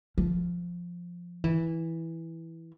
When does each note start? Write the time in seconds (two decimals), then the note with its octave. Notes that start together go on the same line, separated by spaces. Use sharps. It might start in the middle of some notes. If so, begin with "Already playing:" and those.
0.18 F3
1.44 E3